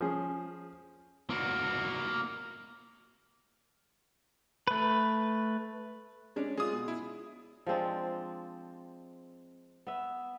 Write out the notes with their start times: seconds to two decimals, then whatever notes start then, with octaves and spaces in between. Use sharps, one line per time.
0.01 F3 C#4 G#4
1.30 A#3 F#4
4.68 A3 B4
6.36 G#3 C#4 D4
6.57 G#3 F4 G#4 D#6
6.72 B2
6.88 E4
7.66 F3 G#3 C4 D4
9.87 B3 E5